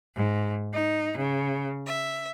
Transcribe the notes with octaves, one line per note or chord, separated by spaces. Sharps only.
G#2
D#4
C#3
E5